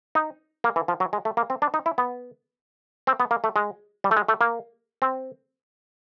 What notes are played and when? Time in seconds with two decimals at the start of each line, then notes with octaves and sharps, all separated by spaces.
0.15 D#4
0.64 A#3
0.76 E3
0.88 F3
1.00 F#3
1.13 G#3
1.25 A3
1.37 A#3
1.50 C4
1.62 D4
1.74 D#4
1.86 E4
1.98 B3
3.07 C4
3.20 B3
3.31 A#3
3.44 A3
3.56 G#3
4.04 G3
4.11 A3
4.17 G#3
4.28 A3
4.41 A#3
5.02 C4